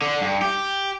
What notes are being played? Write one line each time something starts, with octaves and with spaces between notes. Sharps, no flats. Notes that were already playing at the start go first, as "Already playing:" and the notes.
D3
G2
G4